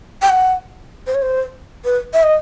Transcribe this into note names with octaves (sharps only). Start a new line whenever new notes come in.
G5
F#5
C5
C#5
C5
B4
E5
D#5